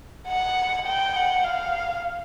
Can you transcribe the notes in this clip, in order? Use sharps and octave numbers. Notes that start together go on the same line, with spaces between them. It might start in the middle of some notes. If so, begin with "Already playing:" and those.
F#5
G5
F#5
F5